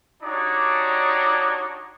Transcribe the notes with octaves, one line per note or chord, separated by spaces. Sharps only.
D4 D#4 F#4 G4 C#5 D5